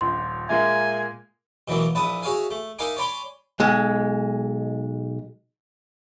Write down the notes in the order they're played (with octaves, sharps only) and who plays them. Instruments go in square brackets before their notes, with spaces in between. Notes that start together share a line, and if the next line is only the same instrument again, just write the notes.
[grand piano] D#1 A#1 [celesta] C6
[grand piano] A#2 G#3 A#3 [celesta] E5 [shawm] G#5
[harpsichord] B2 E3 F#3 A#3
A#1 E4 B4 A5 D#6
F#4 G#4 C#5 E5 F5 G#5
A3
D#4 A#4 E5 F5 G#5 D6
C#5 D5 G#5 B5 C6 D6
[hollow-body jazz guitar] B1 G#3